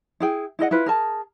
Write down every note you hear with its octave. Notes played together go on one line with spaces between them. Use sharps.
E4 G#4 G5
E4 G#4 D#5 F#5
E4 F4 B4
G#4 A#4 A5